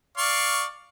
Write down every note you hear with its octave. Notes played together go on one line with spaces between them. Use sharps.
D5 F5 C#6